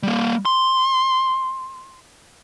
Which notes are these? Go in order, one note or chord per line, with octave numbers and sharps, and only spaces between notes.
G3 A#3
C6